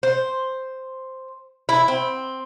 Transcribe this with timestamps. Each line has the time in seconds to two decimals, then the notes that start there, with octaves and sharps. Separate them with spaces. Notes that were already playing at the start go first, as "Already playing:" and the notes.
0.03 C5
1.69 E4
1.88 C4